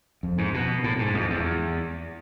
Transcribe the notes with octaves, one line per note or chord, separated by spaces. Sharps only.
F2
G#2
B2
A2
G#2
F2
E2